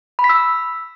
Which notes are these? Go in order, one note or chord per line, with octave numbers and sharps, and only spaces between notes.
B5
B6
E6